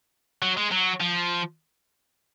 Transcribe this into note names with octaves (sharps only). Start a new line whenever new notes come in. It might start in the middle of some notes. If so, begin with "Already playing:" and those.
F#3
G#3
F#3
F3